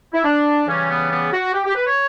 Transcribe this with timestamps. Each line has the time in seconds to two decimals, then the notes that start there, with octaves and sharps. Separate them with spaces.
0.14 E4
0.25 D4
0.67 C#3 E3 G3 C#4
0.89 B3
1.10 B3
1.33 F#4
1.54 G4
1.65 G4
1.75 B4
1.86 C#5